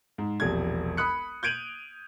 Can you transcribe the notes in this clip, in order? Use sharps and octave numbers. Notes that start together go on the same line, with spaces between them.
G#2
E1 A#1 C3 G#6
B5 D#6 F#6 C#7
G6 G#6 D7 D#7 F7 F#7